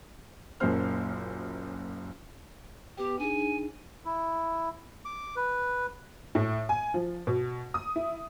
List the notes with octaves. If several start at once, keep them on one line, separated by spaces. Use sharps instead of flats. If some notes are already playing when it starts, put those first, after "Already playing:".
F#1 F#2 A#2 A#3 C5 F6
B3 G4 B4 G5
D4 D#4 G#4 G#5
E4
D6
B4
A2
G#5
F3
B2
D#6
E4